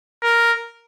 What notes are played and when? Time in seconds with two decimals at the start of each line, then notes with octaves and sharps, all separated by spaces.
0.23 A#4